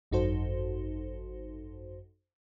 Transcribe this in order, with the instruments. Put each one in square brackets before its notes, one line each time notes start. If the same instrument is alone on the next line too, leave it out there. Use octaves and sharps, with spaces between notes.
[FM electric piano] G#1 F#2 D#4 F#4 A4 C5